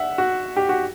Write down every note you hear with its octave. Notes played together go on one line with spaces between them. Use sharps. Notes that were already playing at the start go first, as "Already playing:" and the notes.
Already playing: E5 F#5
F#4
G4
F#4